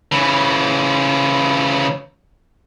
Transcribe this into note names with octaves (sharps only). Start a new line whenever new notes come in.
C#3 E3